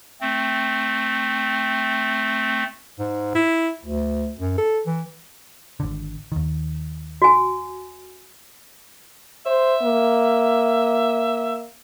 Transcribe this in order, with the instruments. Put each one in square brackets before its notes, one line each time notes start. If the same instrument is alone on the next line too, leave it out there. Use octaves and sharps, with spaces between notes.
[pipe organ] A3 C4
[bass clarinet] G#2
E4
D2
F#2
A4
E3
[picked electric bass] G#1 D3
D#2 D#3
[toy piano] F#4 G#5
[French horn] C5 [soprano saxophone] E5
[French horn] A#3